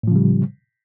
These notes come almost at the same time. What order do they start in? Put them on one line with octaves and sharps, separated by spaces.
A2 F3 C#3 G3